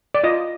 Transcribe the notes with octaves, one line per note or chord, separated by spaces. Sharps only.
D5
F4 D#5